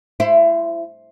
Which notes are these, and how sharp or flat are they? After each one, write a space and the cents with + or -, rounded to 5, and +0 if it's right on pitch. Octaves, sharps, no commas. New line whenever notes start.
E4 +25 C5 +0